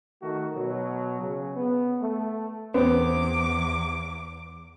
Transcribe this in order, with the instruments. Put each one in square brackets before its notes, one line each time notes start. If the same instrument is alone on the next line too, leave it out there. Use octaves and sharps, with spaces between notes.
[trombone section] D#3 A3 F#4
B2 F#3
C#3
B3
A3
[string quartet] E2 D6 [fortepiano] B3 C4